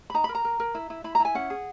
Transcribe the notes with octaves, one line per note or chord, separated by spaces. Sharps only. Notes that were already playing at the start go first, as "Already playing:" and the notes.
B5
D#4 A#5
B5
A#4
A#5
A#4
A#4
E4
E4
E4 B5
A#5
E4
G#5
C#4 F#5
G#4